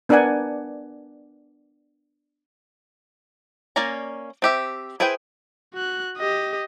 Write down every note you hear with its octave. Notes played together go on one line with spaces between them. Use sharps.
B3 D4 A#4 D5 F#5 G#5
A#3 C#4 D5 G#5 A#5
C4 G4 E5
E4 G#4 B4 C5 G5
F#4 F#6
G4 D#5